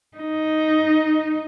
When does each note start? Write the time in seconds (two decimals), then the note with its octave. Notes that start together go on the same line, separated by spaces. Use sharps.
0.18 D#4